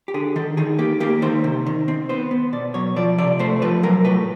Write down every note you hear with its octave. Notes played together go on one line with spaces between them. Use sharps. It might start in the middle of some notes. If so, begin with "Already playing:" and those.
G4
D3 G#4
D#3 A4
D#3 G#4
A#3 G4
A#3 G4
D#3 C5
C3
D#3
C4
B3 C5
B3
B2 D5
F#3 C#5
F3 D5
C3 D5
A3 C5
F3 B4
F#3 A#4
A2 B4